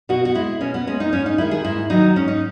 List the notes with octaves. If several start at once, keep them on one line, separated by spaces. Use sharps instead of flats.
B2 F#4
F#4
G#3 E4
B2 C#4
B3
G#3 C#4
D#4
G#2 C#4
D#4
D#3 G#3 E4
G#4
G#2 E4
D#3 F#3 D#4
G#2 C#4
D#4